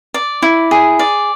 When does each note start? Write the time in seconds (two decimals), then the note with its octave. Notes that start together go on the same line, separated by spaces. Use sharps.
0.14 D5
0.42 E4
0.71 G#4
0.99 D5